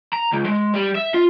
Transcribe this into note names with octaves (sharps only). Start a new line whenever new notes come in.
A#5
C#2
G#3
G3
E5
F4